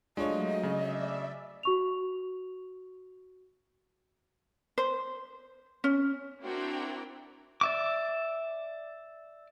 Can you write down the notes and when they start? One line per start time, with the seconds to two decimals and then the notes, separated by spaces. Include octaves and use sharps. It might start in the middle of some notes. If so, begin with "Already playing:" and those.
0.17 F#3 G#3 A3 D4 F4 C#5 D#5
0.63 C#3 D5 E5
1.63 F#4 C#6 F7
4.78 C5
5.84 C#4
6.40 C4 D4 E4 F#4 A#4 G5
7.61 D5 E5 D6